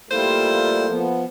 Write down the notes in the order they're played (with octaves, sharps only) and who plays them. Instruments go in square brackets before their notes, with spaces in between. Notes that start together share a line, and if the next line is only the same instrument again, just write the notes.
[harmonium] G3 E4 F4 [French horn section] A3 A#3 A4 [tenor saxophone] C5
[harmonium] F3 B3